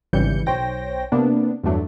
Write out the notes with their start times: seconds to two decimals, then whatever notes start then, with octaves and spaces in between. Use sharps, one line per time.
0.13 G#1 C#3 E3 G3 G6 C#7
0.46 B1 C5 C#5 G5 A#6
1.12 C3 A#3 B3 D4
1.63 E2 G2 D3 F#3 A3 D4